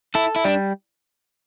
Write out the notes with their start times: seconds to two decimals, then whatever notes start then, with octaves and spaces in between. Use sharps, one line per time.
0.15 E4 A4
0.36 E4
0.45 G3 D4